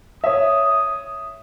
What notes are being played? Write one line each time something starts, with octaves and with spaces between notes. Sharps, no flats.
C#5 E5 D#6